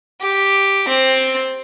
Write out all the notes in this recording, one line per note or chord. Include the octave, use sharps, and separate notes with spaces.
G4
C4